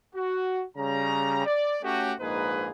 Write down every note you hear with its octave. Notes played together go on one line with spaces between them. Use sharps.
F#4
C#3 G3 A#5
D5
A3 C#4 F#4 G4
A#1 G#2 A#3 D#4 G#4 B4